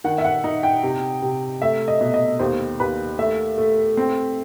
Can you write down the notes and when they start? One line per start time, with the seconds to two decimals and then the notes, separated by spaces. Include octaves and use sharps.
0.04 D#3 F#5
0.18 E5
0.24 F#5
0.44 D#4
0.63 G5
0.83 C3
1.22 C3
1.62 A3 E5
1.88 D#5
2.01 B2
2.14 D#5
2.39 D#2 C5
2.80 D#2 B4
3.19 A3 E5
3.58 A3
3.97 C4